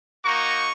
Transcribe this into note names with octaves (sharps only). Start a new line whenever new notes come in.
A#3 D#4 F#4 C#6